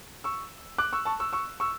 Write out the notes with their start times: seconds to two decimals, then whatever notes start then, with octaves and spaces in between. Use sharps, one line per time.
0.24 C#6 E6
0.78 D6 F#6
0.93 C#6 E6
1.05 A5 C#6
1.20 C#6 E6
1.33 C#6 E6
1.60 C#6 E6